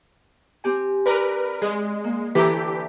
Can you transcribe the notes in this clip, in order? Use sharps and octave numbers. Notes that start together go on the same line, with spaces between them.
C4 G4 G#5
A#4 B4 D5 F6
G#3
A#3
D2 E3 G4 A4 A#5 B6